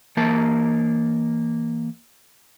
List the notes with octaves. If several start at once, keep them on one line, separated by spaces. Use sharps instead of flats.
E3 A#3 A#4 A5